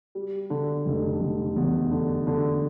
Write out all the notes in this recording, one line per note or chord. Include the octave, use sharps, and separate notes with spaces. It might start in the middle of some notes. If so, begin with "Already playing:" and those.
G3
D3
F1
F1
E2
D3
D3